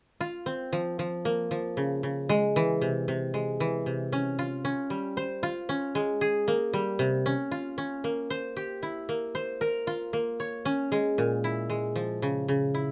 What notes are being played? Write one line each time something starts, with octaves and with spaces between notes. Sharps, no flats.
F4
C4
F3
F3
A#3
F3
C#3
C#3
G#3
E3
C3
C3
G#3
E3
C3
C#4
F4
C#4
G3
C5
F4
C#4
G#3
G#4
A#3
G3
C3
C#4
F4
C#4
A#3
C5
G4
E4
A#3
C5
A#4
F4
A#3
C#5
C#4
G#3
A#2
E4
G#3
F3
C#3
C#3
E4